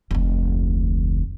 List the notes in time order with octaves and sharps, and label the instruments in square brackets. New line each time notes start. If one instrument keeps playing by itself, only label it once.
[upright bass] F1 D2